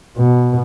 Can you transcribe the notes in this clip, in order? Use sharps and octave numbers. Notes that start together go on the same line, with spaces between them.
B2